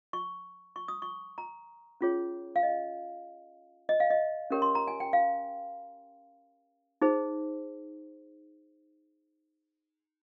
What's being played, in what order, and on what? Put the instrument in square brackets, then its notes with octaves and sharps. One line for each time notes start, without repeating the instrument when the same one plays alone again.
[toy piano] C#6
C#6
D#6
C#6
A#5
C#4 F4 G#4 C#5
F5
D#5
D#5
F5
D#5
C#4 G4 A#4 C#5
C6
A#5
G#5
G5
F5
D#4 G#4 C5